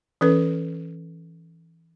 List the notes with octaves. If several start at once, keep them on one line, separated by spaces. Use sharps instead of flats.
E3 C#4 A4 B4